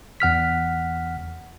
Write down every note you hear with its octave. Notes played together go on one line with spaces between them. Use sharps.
E2 F#5 F6 B6